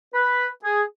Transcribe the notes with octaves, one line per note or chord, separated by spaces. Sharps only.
B4
G#4